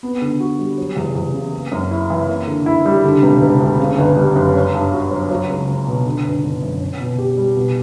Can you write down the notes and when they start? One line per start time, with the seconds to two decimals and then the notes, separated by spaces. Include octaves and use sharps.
0.03 B3
0.21 D3
0.40 F#4
0.59 G3
0.78 F#3
0.97 E2
1.15 E2
1.34 C#3
1.53 A#3
1.72 F#2
1.91 E4
2.10 E3
2.28 A#3
2.47 D3
2.66 E4
2.85 G3
3.04 D3
3.23 E1
3.42 E1
3.60 D2
3.79 C#3
3.98 G1
4.17 G3
4.36 F#2
4.54 C#4
4.74 G2
4.92 F#4
5.11 F#3
5.31 F#3
5.49 C#2
5.68 C#4
5.87 B2
6.06 D3
6.24 G1
6.43 G1
6.62 F#2
6.81 C#4
7.00 B2
7.18 G4
7.37 G3
7.56 B2